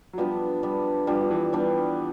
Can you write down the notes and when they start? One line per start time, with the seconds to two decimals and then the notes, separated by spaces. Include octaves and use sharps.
0.13 F#3
0.18 F3 G3 B3 D4
0.63 G3 B3 D4
1.07 F3 G3 B3 D4
1.21 F3
1.31 E3
1.53 G3 B3 D4